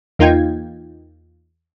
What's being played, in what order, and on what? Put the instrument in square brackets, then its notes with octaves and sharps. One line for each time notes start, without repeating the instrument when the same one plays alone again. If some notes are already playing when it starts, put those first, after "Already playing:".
[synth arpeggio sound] E2 A#3 D#4 F4 G5 G#6